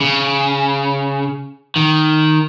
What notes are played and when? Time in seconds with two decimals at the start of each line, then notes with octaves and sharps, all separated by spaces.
0.01 C#3
1.76 D#3